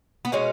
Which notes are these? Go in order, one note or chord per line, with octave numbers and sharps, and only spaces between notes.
B3
B2 G#3 C#4